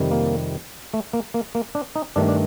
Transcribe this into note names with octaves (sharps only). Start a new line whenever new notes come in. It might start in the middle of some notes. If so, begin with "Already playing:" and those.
Already playing: F2 C3 D#3 G3
A#3
A3
A#3
A#3
A#3
D4
D#4
G2 D#3 A3 D4
D4